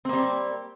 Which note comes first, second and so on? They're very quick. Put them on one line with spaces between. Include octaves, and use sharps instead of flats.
C4 A#3 G3